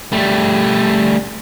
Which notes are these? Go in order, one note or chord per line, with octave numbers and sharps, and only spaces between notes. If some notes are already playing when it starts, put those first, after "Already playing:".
G3 A3